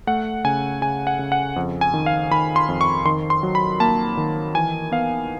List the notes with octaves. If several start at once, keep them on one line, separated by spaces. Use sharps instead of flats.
A3 F#5
C#3 G#5
C#3 G#5
F#5
C#3
F#5
F2
G#5
D#3
F5
D#3 B5
C6
F2
C#6
D#3 C6
C6
F#3
B5
A#3 A5
D#3
E3 G#5
B3 F5